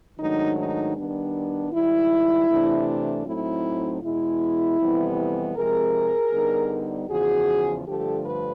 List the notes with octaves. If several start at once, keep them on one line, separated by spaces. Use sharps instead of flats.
G#2 D#3 F#3 A3 D4 D#4
D#4
D#3 G3 B3 D4
G#2 D#3 G3 E4
C3 E3 A3 D4
A2 F#3 A3 C4 D#4 E4
E2 B2 G#3 E4
F2 C3 E3 G3 B3
C3 F3 G#3 C4 G#4 A#4
D3 G3 B3 D#4
E2 C#3 F3 F#4 G#4
G2 D3 F3 A3 G4 A4
B4